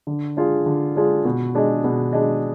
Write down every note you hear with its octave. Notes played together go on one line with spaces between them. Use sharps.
D3
G#3 D4 F4 G#4
D3
G#3 D4 F4 G#4
B2
G#3 D4 G#4 D#5
B2
G#3 D4 G#4 D#5